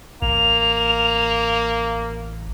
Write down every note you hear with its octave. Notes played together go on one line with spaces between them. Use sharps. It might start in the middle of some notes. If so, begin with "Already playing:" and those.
A1 A#3 F7